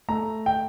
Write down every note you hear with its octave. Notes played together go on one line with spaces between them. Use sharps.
A3 A#5
G5